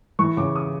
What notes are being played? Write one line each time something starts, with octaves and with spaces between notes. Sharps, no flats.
E3 C#6
C#3 D6
D#6